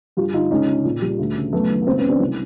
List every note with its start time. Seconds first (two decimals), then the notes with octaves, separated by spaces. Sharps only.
0.17 G2 F4 G4
0.33 D3 D#4 F4
0.51 C#2 C#4 D#4
0.67 C#3
0.85 A#2
1.02 G3
1.19 D2
1.35 C#3
1.52 F#2 A3 B3
1.70 D#3
1.82 B3
1.86 C#2 A#3 C4
1.98 B3 C#4
2.04 C#3
2.09 C4 D4
2.20 C2